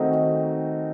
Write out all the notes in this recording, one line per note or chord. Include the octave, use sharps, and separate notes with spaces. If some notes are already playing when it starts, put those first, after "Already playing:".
Already playing: D#3 A3 C4 D#4 F#4